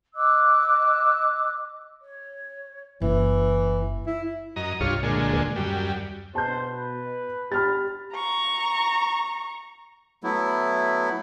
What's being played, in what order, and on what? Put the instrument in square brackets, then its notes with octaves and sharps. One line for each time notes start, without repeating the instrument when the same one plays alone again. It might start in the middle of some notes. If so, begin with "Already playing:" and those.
[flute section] D#5 D6 E6 F#6
C#5
[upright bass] F#1 [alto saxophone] E3
[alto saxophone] E4
[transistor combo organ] F#2 D#5 A#5
[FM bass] C2 [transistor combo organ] G2 F4 C#5
[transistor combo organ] A#2 D3 G#3
[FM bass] D#2
[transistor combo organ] F#2 G3
[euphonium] B2 [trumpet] C5 [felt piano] A5 G6
[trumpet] B4
[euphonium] G4 [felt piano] B5 F6 A6
[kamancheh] A#5 C#6
[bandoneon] F#3 A3 B3 E4